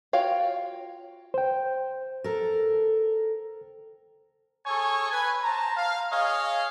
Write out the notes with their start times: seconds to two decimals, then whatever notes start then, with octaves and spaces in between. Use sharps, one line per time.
0.13 F4 F#4 C#5 F5 G5
1.34 C5 G5
2.24 A4 A#4
4.66 G#4 A4 C#5 G#5 C#6
5.10 B4 G#5
5.43 C5 A5 A#5
5.77 F5
6.12 G#4 C#5 D#5 F5